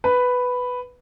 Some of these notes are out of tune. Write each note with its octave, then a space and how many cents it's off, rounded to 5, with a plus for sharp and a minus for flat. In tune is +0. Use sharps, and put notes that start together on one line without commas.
B4 +5